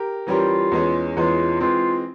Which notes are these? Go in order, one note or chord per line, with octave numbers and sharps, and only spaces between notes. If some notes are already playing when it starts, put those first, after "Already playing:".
Already playing: G4 A#4
E3 G3 C#4 F4 G4 A#4
E2 E3 G#3 C#4
E2 E3 G#3 C#4 F4
E3 G#3 C4 F4